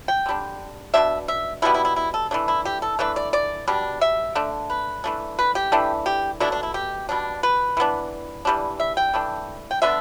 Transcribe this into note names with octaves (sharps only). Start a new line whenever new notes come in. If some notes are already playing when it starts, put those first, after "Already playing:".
G5
D3 G3 D4
B2 A3 D4 E5
E5
B2 G3 B3 E4
E4
E4
E4
A4
E3 A3 D4
E4
G4
A4
E3 A3 D4 B4
D5
D5
B2 G3 D4
E5
D3 A3 D4
B4
E3 A3 D4
B4
G4
E3 A3 D4
G4
B2 A3 D4 E4
D4
E4
G4
B2 G3 D4
B4
E3 B3 D4
E3 G3 D4
E5
G5
E3 A3 D4
G5
D3 B3 D4 E5